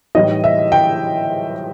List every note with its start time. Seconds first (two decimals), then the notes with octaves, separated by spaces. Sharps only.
0.15 A2 E3 G3 D#4 D#5
0.44 E5
0.72 G5